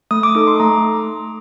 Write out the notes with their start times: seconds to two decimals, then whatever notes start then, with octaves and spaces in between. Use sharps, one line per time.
0.11 A3 D#6
0.23 D6
0.35 D#4 A4 D6
0.47 C6
0.60 A3 A#5